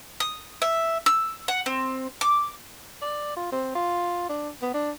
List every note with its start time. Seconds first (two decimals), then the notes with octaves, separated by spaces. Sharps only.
0.20 D#6
0.62 E5
1.06 E6
1.48 F#5
1.66 C4
2.21 D6
3.02 D5
3.36 F4
3.52 C4
3.75 F4
4.29 D4
4.62 B3
4.74 D4